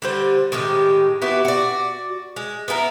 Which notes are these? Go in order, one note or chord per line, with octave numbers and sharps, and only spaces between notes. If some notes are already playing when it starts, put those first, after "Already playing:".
D3 G3 C5
A2 D#3 G#3 G4
B3 E4 F#4 G4
F#4 D5
G#3
B3 E4 G#4 A#4